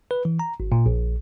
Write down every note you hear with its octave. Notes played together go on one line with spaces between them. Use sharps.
B4
E3
A#5
G#1
A#2
A#1